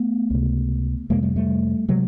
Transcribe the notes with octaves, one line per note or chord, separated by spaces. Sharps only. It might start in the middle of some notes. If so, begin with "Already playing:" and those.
Already playing: A3 B3
C#2 C3
F2 C3 G#3 A#3
G3 A3
G3 A3
C3 F#3 G#3